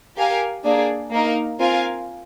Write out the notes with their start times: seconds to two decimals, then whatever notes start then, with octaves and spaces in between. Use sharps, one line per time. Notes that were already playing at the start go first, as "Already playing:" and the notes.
0.17 G4 A#4 F5 G#5
0.64 A#3 D4 G#4 D5
1.11 A#3 D#4 A#4
1.59 C4 F4 A#4 F5 G#5